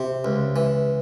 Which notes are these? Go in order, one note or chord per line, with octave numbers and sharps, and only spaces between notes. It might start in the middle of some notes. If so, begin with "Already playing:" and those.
Already playing: C3
C#2
E3